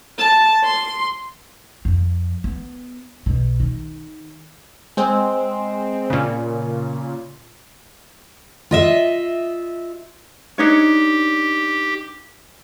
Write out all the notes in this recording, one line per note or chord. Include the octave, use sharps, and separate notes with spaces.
A5
C6
F2
B3
B1 B2
D#3
G#3 C4
A#2 C#3
F4 D#5 E5
D4 D#4 G4 C#5